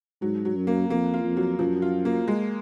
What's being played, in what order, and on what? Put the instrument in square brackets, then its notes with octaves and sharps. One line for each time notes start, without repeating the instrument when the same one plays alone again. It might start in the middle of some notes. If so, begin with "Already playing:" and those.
[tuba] G#2 [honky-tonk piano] F#3
[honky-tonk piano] F#3
[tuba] F#2
[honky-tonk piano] A#3
[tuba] F2 [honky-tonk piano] A#3
[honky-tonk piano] F4
[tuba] F2
[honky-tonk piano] F#3
[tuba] F#2 [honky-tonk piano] F3
[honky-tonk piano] F4
A#3
G#3